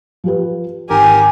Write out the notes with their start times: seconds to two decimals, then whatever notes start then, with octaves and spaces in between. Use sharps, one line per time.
0.24 F3 G4 B4
0.90 G#1 G4 A#4 G#5